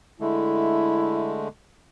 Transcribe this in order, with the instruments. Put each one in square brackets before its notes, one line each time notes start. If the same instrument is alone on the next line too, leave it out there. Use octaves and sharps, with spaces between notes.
[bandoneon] D3 G#3 A3 [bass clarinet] E4